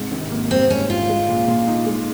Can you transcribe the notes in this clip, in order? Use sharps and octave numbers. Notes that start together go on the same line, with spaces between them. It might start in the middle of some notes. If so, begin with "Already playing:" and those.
Already playing: G#2 C3
G#1
A#3
G3 C4
G#2 C#4
G#1 F4
G#3
A#2
A#2
D#4
G#3